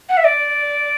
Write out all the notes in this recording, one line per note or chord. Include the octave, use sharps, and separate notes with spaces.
F#5
E5
D5